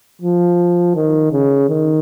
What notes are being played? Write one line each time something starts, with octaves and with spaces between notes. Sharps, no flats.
F3
D#3
C#3
D#3